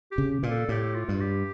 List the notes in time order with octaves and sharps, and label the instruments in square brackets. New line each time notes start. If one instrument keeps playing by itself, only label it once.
[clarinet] G4
[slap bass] C#3
A#2
[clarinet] A4
[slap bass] A2 [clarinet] G4
[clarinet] F4
[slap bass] G2
[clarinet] G4